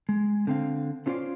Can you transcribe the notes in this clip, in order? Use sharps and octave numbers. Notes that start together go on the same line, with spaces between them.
G#3
D3 C4 F5
A3 C#4 F4 C5 D5 F5